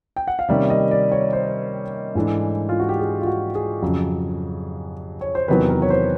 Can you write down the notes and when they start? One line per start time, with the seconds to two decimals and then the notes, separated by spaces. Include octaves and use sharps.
0.16 G5
0.27 F#5
0.39 F5
0.48 C3 D#3 G3 A#3 C#4 E5
0.70 D#5
0.91 D5
1.12 C#5
1.33 C5
2.15 G#2 E3 A3 D4
2.69 F4
2.80 F#4
2.89 G4
2.99 G#4
3.21 F4
3.26 F#4
3.55 G#4
3.82 F2 C#3 F#3
5.21 C#5
5.35 C5
5.48 E2 C3 D#3 F#3 B3 B4
5.69 A#4
5.82 C#5
5.90 C5